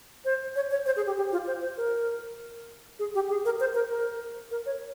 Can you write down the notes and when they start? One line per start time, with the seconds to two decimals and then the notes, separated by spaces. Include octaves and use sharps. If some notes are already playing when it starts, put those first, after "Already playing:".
0.25 C5
0.56 C#5
0.71 C#5
0.86 C5
0.96 G#4
1.06 G4
1.17 G4
1.32 F4
1.47 C5
1.62 C5
1.77 A#4
2.99 G#4
3.15 G4
3.29 G#4
3.45 A#4
3.60 C5
3.74 A#4
3.90 A#4
4.51 A#4
4.66 C#5